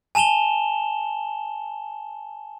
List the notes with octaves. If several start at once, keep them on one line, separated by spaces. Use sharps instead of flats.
G#5 A5 E7 F7 G7